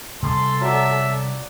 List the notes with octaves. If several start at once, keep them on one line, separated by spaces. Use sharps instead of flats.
C3 G3 C#4 A4 C6
F#3 D5 E5